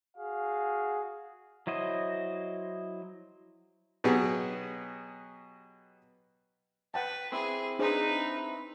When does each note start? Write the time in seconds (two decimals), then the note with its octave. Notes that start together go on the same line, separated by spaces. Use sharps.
0.16 F#4 G#4 F5
1.67 F#3 E4 C5 D#5
4.04 B2 F#3 B3 G4 G#4
6.94 B4 F#5 G5 A5
7.32 C4 E4 G#4
7.79 D4 D#4 G#4 B4 C5